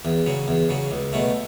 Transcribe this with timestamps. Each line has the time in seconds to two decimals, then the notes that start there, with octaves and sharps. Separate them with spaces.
0.05 E2
0.26 C#3 F#3
0.48 E2
0.69 C#3 F#3
0.91 C#2
1.13 B2 F#3 A3